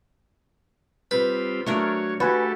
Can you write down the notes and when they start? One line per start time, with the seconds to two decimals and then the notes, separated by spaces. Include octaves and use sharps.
1.11 G3 C4 F4 B4
1.66 F#3 A3 D4 A#4 C#5
2.20 A3 F#4 G4 A4 B4 G#5